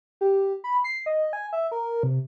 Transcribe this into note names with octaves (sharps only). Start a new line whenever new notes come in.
G4
B5
C7
D#5
G#5
E5
A#4
C3